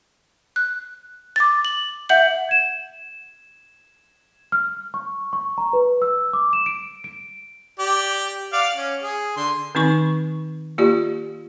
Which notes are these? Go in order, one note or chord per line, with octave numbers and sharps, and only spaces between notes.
F#6
D6 A6
F#7
E5 F#5 G6 F#7
G#6 E7
F6
C#6
C#6
A#5
B4
E6
D6
E7
D7
D7
G4 D5
D5 F5 F#5
C#4
G#4
D3 C6
D#3 C4 D#4 C#6
A#3 F4 G4 D5